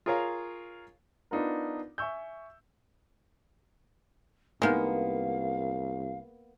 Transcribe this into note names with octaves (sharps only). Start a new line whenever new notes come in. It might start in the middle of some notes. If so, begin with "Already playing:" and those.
F4 G#4 A#4 C#5 F5
B3 D4 D#4 F4 A#4
E5 G#5 C#6 E6 G6
C2 D#3 G#3 A#3 B3 F5